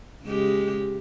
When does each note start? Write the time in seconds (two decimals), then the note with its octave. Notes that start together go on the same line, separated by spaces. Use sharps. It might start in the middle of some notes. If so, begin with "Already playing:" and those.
0.24 C#3 G#3 G4